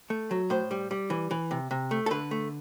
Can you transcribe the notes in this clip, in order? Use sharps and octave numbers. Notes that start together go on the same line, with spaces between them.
A3
F#3
A2 C5
G3
G3
E3
E3
C3
C3
A3
A4
D3 B4
A3